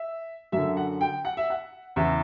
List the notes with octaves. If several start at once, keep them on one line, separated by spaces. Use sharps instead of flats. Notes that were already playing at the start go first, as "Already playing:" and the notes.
Already playing: E5
F#2 D3 E5
F#5
G5
F#5
E5
F#5
E2 C#3 E3 E5